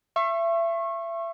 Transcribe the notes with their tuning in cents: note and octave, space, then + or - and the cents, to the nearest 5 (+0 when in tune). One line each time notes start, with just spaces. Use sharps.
E5 +30 C#6 -30